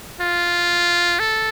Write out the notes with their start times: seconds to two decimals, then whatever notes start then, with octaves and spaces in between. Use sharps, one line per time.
0.21 F4
1.20 A4